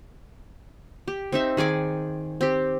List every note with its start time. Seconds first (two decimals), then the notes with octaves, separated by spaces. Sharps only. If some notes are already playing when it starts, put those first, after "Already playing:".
1.08 G4
1.32 C4 D#4 E5
1.57 D#3 G#4 D5 D6
2.41 C4 G4